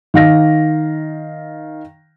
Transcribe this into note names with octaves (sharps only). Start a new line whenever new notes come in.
D#3 F5 A#6